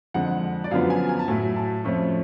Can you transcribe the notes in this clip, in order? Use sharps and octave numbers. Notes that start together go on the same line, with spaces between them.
F2 D3 G#3 F#5
D5
F#2 D3 F3 B3 F4 F5
G#5
G#5
A5
A2 F#3 A3 G#5
A5
F2 F3 A3 C#4 F4 C#6